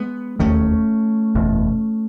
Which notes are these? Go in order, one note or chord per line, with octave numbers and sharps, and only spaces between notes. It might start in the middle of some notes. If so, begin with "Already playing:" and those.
Already playing: G#3 B3
E1 D#2 D#3 A3 C#4
F#1 E2 B2